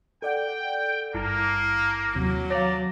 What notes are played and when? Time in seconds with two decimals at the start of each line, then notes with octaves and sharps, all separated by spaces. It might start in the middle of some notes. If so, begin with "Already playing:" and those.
0.22 A4 D5 F#5 G5
1.14 G#1 G2 A#3 E4 A5
2.15 D#2 C3 F#3
2.50 C#5 D5 F5 A5 A#5